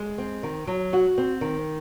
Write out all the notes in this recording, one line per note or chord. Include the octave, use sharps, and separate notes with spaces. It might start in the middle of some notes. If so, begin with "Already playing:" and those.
Already playing: G#3
C4
D#3
F#3
F#4
C4
D#3